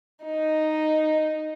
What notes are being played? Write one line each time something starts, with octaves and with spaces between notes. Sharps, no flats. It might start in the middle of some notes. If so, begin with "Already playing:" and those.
D#4